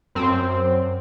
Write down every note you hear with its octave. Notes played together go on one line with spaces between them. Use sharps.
F#2 C4